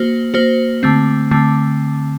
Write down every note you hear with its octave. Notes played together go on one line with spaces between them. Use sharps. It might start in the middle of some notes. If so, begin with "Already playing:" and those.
Already playing: A#3 F#4 C5
A#3 F#4 C5
D3 A3 C4
D3 A3 C4